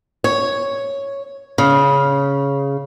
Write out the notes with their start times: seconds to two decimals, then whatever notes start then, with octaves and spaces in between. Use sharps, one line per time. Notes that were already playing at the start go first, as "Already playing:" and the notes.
0.24 C#5
1.58 C#3